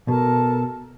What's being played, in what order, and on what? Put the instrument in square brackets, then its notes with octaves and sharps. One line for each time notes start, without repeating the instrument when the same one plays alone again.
[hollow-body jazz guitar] B2 [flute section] A4 A#4 A5